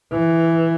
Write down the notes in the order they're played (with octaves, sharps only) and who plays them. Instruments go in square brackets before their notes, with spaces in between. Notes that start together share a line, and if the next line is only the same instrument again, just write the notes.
[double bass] E3